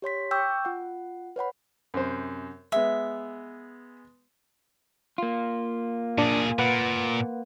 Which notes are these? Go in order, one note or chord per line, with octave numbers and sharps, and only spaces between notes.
G4 C#5 C6 B6
G5 C#6 D6 E6 G6
F4 F#5
B4 C#5 F#5 B5
F#2 C3 C5
G#3 B3 E5
A#3 F4
A#2 D4 G#4
A#2 B4 F#5